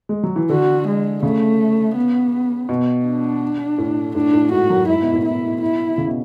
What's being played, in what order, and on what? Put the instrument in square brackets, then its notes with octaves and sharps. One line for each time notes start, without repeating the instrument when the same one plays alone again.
[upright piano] G#3
F#3
E3
[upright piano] D3 [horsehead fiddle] F#4
[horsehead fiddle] G#3
[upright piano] C#3 [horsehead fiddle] A3
[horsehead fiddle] B3
[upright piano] B2
[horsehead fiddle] D4
[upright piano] A2
[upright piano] A2 [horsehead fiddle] D4
[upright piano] A2
[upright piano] G#2 [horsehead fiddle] F#4
[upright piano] F#2
[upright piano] G#2 [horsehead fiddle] E4
[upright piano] B2
A2
[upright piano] B2 [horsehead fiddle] E4
[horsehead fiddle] E4
[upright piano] C#3
B2